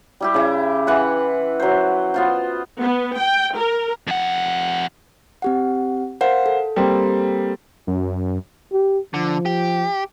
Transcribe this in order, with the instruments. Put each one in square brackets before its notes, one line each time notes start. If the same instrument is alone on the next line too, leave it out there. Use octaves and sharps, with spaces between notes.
[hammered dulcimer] G3 E4 G4
C#3 E4
E3 F#5 C6
F#3 C5
B3 F4 C5
[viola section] B3
G5
A#4
[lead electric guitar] F2 F#5
[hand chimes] C4 G4 F#5
[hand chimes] A#4 F5 F#5 [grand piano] C5
[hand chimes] A4
[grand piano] G3 A#3 C4
[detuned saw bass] F#2
[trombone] G4
[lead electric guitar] D3 [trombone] F3
[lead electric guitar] G4